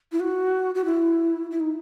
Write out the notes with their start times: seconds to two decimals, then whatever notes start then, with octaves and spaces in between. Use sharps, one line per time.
0.12 E4
0.20 F#4
0.75 F#4
0.85 E4
1.51 E4
1.60 D#4